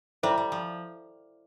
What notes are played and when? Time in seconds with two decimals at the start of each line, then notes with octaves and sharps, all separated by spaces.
0.23 G3 E4 A4 C5 E5
0.38 G3
0.52 F3